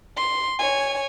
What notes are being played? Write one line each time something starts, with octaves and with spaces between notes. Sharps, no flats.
C6
C#5 G#5